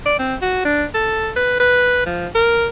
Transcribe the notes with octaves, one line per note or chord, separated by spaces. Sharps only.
D5
C4
F#4
D4
A4
B4
B4
F3
A#4